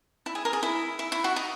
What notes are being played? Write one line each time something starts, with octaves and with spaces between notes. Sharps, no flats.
E4
G#4
A#4
G#4
E4
E4
E4
F#4
D#4